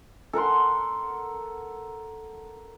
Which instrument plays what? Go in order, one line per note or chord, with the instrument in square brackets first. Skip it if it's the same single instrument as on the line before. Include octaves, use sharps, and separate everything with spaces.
[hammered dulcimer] A4 A#4 F#5 C6